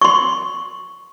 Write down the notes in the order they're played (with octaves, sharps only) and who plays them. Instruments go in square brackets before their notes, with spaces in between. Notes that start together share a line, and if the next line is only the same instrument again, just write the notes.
[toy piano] C6 C#6